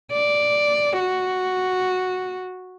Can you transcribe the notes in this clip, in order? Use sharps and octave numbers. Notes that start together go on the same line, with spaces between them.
D5
F#4